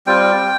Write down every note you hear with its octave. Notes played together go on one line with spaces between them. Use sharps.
G3 C4 F4 G5